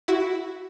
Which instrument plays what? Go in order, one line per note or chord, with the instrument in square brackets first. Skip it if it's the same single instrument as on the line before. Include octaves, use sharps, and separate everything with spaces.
[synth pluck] E4 F#4